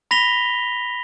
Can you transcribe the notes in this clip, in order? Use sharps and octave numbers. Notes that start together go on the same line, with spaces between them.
B5 A#6 B6 F7 G7